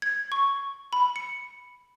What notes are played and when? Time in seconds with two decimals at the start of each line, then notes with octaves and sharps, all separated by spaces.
0.02 G#6
0.32 C#6
0.93 B5
1.16 C#7